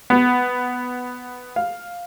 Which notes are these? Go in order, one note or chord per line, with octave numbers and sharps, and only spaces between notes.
B3
F5